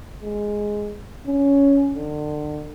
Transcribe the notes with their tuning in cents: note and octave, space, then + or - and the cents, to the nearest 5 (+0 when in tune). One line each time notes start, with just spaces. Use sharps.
G#3 +0
C#4 +10
D3 +35